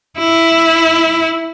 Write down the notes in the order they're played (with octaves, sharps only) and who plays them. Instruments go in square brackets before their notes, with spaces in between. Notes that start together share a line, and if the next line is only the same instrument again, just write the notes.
[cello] E4